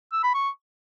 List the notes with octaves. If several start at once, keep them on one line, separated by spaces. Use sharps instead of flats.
E6
B5
C#6